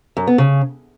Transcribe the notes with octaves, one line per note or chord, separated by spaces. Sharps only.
F#2
B3
C#3